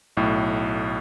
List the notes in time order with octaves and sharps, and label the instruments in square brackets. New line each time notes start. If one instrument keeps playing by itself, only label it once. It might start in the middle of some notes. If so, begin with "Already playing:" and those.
[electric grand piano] B1 A2